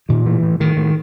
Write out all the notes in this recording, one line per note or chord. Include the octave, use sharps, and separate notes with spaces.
A#2 D#3
A2 E3
A2
A2 D#3
A2